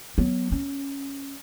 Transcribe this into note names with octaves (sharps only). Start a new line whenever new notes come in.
F#3 B3
C#4